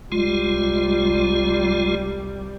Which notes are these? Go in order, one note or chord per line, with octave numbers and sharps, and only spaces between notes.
C2 G3 G#3 F4